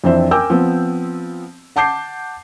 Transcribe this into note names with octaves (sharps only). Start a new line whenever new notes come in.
F2 E3 C4 D4 C5 E5
A#4 G5 G#5 D6 E6 G6
F3 B3 C4
F#5 A5 D6 G6 C7